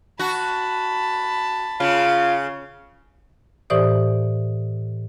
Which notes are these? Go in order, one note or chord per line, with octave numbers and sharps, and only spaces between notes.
F#4 A5 B5
C#3 F4
A2 E3 G4 C5 D5 D#6